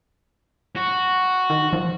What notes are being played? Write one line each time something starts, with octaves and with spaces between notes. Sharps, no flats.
F#4
D#3
F3